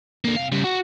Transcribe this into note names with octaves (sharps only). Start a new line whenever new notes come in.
D3 A#3
C3 F5
C#3 G3
F#4